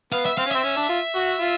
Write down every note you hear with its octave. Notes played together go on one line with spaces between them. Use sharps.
B3 F5
E5
C4 F5
C#4
C4 E5
C#4
D4
F4
F#4
F4